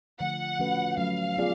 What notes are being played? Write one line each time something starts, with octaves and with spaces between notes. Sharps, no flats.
D3 F3 A3 F#5
F3 A3 C#4 F#4 B4
F#3 A3 C#4 F5
B3 F4 G#4 D5